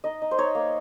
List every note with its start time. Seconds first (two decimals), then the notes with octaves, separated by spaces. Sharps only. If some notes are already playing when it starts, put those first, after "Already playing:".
0.04 D#4 D#5
0.22 D#4
0.31 C5
0.38 D#4 C#5
0.55 A#3